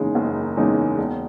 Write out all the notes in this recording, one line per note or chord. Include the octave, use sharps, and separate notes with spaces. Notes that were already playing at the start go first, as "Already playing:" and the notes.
Already playing: F#1 E2 C#3 G#3 D#4
F#1
E2 C#3 G#3 D#4
E1